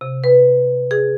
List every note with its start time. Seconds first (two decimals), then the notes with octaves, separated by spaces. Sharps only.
0.01 C3
0.24 B4
0.91 G#4